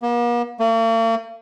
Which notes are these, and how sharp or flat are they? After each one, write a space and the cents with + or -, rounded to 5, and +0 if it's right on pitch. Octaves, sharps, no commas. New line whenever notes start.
A#3 +45
A#3 -45